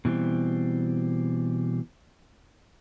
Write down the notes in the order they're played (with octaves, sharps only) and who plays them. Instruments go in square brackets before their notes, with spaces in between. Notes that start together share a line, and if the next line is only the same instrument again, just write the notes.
[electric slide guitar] B2 E3 G3 C4